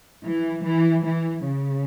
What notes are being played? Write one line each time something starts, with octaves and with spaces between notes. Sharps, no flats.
E3
E3
E3
C#3